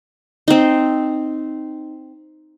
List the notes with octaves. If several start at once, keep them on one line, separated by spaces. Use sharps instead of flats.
C4 D#4